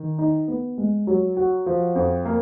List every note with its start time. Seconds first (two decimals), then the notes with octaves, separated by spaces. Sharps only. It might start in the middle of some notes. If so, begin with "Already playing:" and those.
Already playing: D#3
0.19 D#4
0.48 B3
0.78 G#3
1.07 F#3
1.37 F#4
1.66 F3
1.95 F2
2.25 A#3